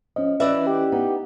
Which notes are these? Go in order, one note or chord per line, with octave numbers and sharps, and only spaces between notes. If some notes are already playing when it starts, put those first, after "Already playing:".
F3 C#4 D#5
E3 F#4 B4 D5 E5
G4
B3 D#4